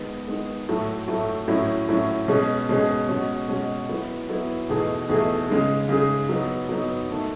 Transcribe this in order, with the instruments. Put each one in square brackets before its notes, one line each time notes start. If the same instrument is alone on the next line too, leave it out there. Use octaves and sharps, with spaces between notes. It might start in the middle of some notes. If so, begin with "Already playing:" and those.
Already playing: [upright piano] D#3 G#3 B3
D#3 G#3 B3
A2 F#3 A3
A2 F#3 A3
A2 F#3 C#4 E4
A2 F#3 C#4 E4
B2 G#3 C#4 G#4
B2 G#3 C#4 G#4
B2 G#3 C#4 F#4
B2 G#3 C#4 F#4
F#3 B3 E4
F#3 B3 E4
E2 B2 A3 D#4 G#4
E2 B2 A3 D#4 G#4
C#3 G#3 D#4 G#4
C#3 G#3 D#4 G#4
F#3 B3 D#4
F#3 B3 D#4
G#2 D#3 A3